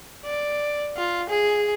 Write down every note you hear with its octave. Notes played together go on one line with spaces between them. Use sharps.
D5
F4
G#4